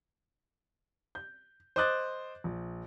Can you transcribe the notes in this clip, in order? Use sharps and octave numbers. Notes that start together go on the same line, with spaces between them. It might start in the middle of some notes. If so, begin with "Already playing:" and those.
G6
C5 D#5 D6 D#6 F#6 A6
A#1